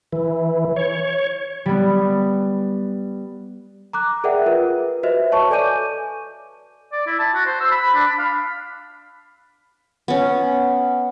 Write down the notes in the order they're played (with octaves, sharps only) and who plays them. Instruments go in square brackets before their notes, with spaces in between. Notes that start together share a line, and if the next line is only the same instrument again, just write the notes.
[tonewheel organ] E3
C#5
[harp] G3 B3
[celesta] A#5 D6 F#6
G#4 A#4 D5 E5 F#5 G5
F4 A#4 B4
F#4 B4 C5 D#5 E5
C#5 A5 C#6
A4 D5 G#5 D6 G6 D#7
[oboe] D5
E4
A5
F#4
C5
E6
B5
D4
B5
F5
[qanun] B3 C#4